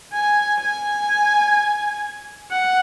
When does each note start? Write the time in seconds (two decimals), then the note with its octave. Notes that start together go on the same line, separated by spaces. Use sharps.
0.13 G#5
0.60 G#5
2.51 F#5